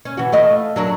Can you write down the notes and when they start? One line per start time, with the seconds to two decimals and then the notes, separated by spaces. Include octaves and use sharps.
0.05 C#4
0.17 E3 F#4
0.32 A3 F4 D#5
0.76 F#3 D4 A#4